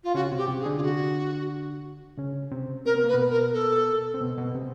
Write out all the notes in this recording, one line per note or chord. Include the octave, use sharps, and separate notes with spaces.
F4
C#3 C#4 F#4
C3 C4
G4
C3 C4
G#4
D3 D4
F4
F#4
C#3 C#4
C3 C4
C4 A#4
B3
A#3 B4
B2 B3
A#4
A4
C4
B2 B3
B2 B3
C3 C4